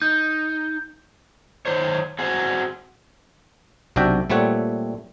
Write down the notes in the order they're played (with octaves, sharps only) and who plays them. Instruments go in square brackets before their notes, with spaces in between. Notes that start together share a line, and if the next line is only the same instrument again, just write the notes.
[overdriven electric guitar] D#4 [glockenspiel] G6
[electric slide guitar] D#3 F#3 C5 C#5
C4 F#4 G#4
[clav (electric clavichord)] B1 C3 D4 F#4 E5 G5
A#2 G3 A3 C4 C#5 F#5